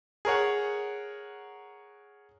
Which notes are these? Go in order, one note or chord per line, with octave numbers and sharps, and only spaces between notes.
G#4 A#4 C#5 F#5